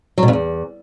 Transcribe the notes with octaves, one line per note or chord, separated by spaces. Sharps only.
F#3
B2
F2
E2